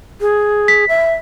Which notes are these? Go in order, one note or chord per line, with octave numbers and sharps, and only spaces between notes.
G#4
B6
E5